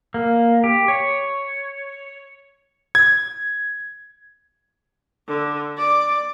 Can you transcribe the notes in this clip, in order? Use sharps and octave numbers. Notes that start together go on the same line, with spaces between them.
A#3
G4
C#5
G#6
D3
D5